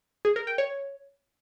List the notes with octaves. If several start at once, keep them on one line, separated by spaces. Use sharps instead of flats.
G#4
A#4
G5
C#5